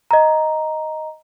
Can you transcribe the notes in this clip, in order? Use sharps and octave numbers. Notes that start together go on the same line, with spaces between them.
D#5 A#5